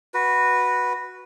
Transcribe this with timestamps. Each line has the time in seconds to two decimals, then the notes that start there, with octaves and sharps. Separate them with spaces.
0.14 F#4 B4